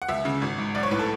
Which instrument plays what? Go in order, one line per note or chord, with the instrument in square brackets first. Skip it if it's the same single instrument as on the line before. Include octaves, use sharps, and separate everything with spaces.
[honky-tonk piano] F#5
C#2 E5
C#3
G#1
G#2
B1 D5
C#5
A2 B4
A4